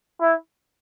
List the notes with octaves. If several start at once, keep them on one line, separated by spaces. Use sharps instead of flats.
E4